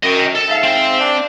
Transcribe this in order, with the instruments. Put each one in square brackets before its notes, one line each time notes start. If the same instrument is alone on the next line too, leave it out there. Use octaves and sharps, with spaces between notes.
[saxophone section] F#2 [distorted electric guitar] D#5 G5
[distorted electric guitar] A4
[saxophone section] G#2 E5 F5
[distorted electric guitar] C4
[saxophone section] D4